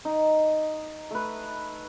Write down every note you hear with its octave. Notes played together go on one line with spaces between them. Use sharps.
D#4
A3 B4